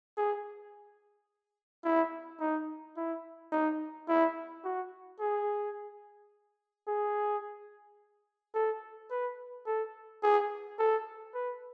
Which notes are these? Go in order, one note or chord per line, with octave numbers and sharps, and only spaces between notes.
G#4
E4
D#4
E4
D#4
E4
F#4
G#4
G#4
A4
B4
A4
G#4
A4
B4